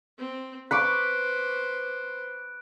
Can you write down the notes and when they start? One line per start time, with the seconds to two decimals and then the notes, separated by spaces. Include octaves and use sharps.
0.18 C4
0.71 B4 C5 B5 C#6 D6 F#6 D7